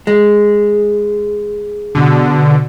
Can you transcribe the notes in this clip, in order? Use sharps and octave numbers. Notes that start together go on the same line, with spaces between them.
G#3
B2 D3